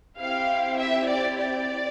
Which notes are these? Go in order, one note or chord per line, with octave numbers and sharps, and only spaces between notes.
C4 E4 G4 F5
E5
D5
D5